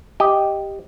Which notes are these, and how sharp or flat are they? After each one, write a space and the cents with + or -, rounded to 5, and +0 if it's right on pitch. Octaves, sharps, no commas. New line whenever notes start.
G4 +0 D#5 +0